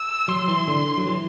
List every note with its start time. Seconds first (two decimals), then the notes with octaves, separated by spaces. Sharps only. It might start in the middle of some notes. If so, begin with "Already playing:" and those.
Already playing: E6
0.28 F#3 C6
0.48 E3
0.68 D3
0.98 F#3
1.07 E3